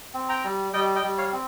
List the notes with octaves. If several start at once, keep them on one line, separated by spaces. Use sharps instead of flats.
C4
G5 A#5
G3
G3 D#5 G5
D#5 G5
G3
C#5 F5
C4